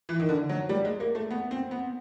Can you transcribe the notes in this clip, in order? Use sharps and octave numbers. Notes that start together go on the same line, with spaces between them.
E3
D#3
D3
F#3
G3
G#3
A#3
A3
B3
C4
B3